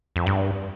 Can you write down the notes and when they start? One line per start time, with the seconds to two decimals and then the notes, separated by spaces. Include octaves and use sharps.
0.16 F2
0.26 G2